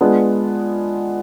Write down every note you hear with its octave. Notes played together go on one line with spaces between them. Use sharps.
G#3 B3 D4 F4 G#4